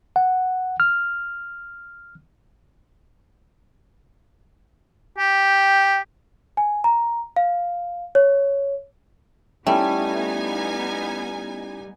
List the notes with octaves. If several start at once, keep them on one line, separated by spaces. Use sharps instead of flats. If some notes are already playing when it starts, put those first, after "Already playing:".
F#5
F6
G4 G5
G#5
A#5
F5
C#5
G3 A3 B3 C#4 D#4 E4 G5 G#5